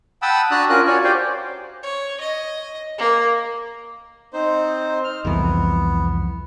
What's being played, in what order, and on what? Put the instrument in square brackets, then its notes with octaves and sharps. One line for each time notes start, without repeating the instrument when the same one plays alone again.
[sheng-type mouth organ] F#5 G5 A5 B5 D#6 E6
D4 F#4 D5 A#5 D#6 F#6
C#4 F4 F#4 A#4 F#6
F#4 C#5 D5 G#5
G4 C5 D5 F5 G5
[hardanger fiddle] C#5
D#5
A#3
[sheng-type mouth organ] C4 D#4 C5
F6
[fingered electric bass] C2 F2 E3 [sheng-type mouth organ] B3